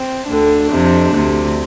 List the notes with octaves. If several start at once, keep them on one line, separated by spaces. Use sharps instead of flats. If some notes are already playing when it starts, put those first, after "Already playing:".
Already playing: C4
D2 D3 D4
F2 C3
D2 C3